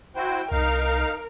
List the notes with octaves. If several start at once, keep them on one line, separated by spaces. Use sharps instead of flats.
E4 F#4 C5 G5
C2 D#4 A#4 F5